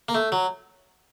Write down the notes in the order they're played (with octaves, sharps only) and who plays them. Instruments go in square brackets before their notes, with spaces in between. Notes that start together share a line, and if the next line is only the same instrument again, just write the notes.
[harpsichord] A#3
A3
F#3